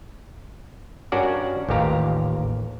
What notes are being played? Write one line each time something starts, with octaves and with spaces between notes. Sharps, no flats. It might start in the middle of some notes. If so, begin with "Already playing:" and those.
G2 C#4 D4 F#4 A#4 D5
A1 D#2 A#2 G4 F5 A#5